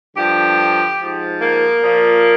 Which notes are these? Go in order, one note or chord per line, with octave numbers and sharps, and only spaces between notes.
G2 D3 F3 G4
G#2 F3
A#3
A#2 F3